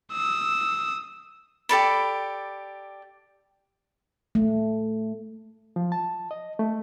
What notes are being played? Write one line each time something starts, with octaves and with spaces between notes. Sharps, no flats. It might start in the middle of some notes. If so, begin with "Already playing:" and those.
D#6 E6
G4 A4 D5 B5
A3
F3
A5
D#5
A3